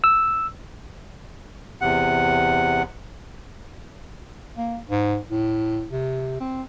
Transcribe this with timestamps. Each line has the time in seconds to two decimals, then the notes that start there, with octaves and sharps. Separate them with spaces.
0.04 E6
1.81 E2 C3 F#5
4.57 A#3
4.88 G#2
5.30 A2
5.92 C3
6.41 C4